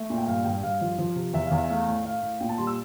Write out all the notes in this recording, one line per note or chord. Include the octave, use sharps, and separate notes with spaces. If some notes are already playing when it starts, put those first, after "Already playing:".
Already playing: A3 E5
A#2
G5
G2 F5
G2 G5
G2 F5
F3
F3
C3
E2 E5
E2 F5
E5
A3 F5
A2
A3 F5
A2
A#2 G5
A5
G3 C6
E6